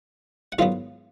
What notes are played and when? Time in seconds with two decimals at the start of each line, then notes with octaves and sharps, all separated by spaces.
0.52 F#5
0.59 G#2 D#3 F#3 B3 F4 F5